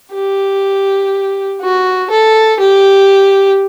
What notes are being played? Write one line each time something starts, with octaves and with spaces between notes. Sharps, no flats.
G4
F#4
A4
G4